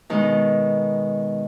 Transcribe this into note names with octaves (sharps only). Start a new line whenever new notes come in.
B2 D#3 G#3 B3 D#4